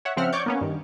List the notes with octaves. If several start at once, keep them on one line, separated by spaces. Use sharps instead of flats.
C#5 E5 F#5
C#3 F3 C4 E5 F#5 F6
C#5 D5 C#6 D6 G6
A#3 B3 C#4
G2 D#3